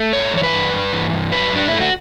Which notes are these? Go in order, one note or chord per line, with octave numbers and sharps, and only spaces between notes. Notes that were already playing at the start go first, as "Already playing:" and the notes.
Already playing: A3
G2 C#5
E3 C#5
B4
G2
G2
E3
G2
F#3 B4
G2 D4
A3 E4
F#4